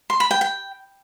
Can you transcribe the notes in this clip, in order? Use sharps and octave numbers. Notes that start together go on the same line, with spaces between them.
C6
B5
G5
G5